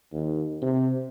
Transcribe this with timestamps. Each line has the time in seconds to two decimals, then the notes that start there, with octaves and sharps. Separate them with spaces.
0.13 D#2
0.62 C3